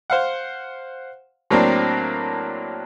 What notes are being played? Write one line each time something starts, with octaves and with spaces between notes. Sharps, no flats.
C5 F5 F#5
A2 F#3 A#3 C4 D4